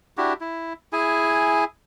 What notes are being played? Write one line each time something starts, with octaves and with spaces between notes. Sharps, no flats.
D4 E4 F#4 G4
E4
E4 G#4 G#5